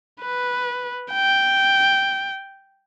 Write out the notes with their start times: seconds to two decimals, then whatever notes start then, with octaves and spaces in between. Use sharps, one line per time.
0.21 B4
1.13 G5